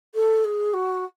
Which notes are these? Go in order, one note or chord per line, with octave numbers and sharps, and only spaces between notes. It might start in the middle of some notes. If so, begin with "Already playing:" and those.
A4
G#4
F#4